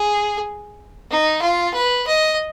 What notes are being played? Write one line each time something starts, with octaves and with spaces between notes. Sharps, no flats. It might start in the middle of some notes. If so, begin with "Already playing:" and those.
Already playing: G#4
D#4
F4
B4
D#5